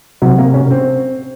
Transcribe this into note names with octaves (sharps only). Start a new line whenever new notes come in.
C3 F#3
A#3
C#4
C4